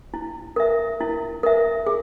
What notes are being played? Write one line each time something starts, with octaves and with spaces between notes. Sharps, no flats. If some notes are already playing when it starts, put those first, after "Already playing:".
E4
A#4 E5
E4
A#4 E5
G#4